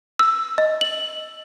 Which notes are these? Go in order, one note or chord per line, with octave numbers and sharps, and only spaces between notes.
E6
D#5
F#7